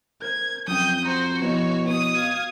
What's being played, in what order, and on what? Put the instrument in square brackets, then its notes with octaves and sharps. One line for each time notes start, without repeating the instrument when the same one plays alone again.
[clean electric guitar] A#4 C5 [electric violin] G#6
[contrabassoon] F2 [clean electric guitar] F#3 C#4 G5 [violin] D#6 [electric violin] G6
[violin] F#4 [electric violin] C5 [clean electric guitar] A#5
[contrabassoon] B2 [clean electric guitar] F3 E4 [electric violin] C#5
[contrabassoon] B2 [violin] D#6
[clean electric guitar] F#4 [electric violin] F5 G#6